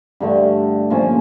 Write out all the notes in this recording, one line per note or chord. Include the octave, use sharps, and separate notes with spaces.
G2 D3 A3
A#2 F3 C#4